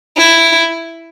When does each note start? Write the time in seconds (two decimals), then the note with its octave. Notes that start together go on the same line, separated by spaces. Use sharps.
0.17 E4